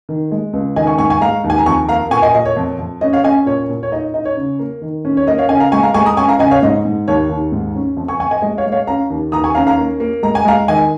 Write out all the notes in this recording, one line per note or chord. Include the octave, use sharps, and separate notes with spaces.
D#3
G#3
C#2
D#3 D#5 G#5
G#5 C#6
G#2 G#5 C#6
G#5 C#6
G#3 F5 A#5
D#2
G#5
A#5
F2 G#5 C#6
A#3 F5 A#5
A#2 G#5 C#6
D#5 G#5
A#2 D#5
C#5
F2
F2
C#4 D#5
C#5 F5
C#4 D#5 G#5
A#2 C#5
A#2
C#5
D#4 D#5
D#4 D#5
C#5
C#3
A#3
D#3
C#4
C#5
A#3 D#5
C#5 F5
C#3 D#5 G#5
F5 A#5
G#3 G#5 C#6
F5 A#5
G#3 G#5 C#6
A#5 D#6
C#4 G#5 C#6
F5 A#5
C#3 D#5 G#5
C#5 F5
G#2 D#5
G#2
D#2 C#5
D#2
G#2
C#4
F2
G#5 C#6
F2 G#5 C#6
D#5 G#5
G#3 D#5
C#5 F5
G#3
C#5 F5
C#4 F5 A#5
D#2
D#2 A#5 D#6
G#5 C#6
C#4 F5 A#5
F5 A#5
A#3
A#3
G#3 A#5
G#5
G#3 F5 A#5
D#3 D#5 G#5